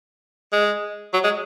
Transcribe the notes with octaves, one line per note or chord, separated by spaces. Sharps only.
G#3
F#3
G#3